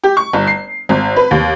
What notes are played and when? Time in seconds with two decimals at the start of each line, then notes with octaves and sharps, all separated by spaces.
0.04 G4
0.17 C#6
0.33 G1
0.47 C7
0.89 G#1
1.16 B4
1.31 D#2